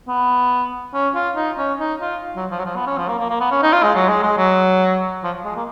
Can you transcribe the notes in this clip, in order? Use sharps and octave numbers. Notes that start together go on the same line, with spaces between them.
B3
C#4
F4
D#4
C#4
D#4
F4
F#3
F3
F#3
F3
B3
C#4
F3
A#3
A#3
A#3
B3
C#4
D#4
F4
G#3
F#3
G#3
G#3
F#3
F3
G#3
A#3